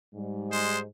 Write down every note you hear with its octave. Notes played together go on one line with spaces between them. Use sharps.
G#2 G3
G#3 C5